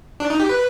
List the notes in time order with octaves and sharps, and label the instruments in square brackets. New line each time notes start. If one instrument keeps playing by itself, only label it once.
[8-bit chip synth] D4
D#4
G4
B4